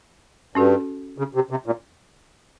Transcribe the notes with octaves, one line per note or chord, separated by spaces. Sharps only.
G2 C#4 F#4 A4
C#3
C3
C3
A#2